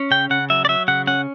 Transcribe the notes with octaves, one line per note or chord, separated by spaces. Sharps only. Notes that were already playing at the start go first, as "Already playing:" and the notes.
Already playing: C#4
C#3 G5
C#3 F#5
F#3 E5
D5
F#3 E5
C#3 F#5
C#4 F#5